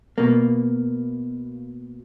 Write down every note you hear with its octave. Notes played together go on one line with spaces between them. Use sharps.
B2 A#3